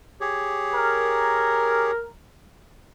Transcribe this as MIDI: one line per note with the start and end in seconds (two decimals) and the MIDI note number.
0.21 1.91 67
0.21 1.91 68
0.21 1.91 73
0.74 2.07 70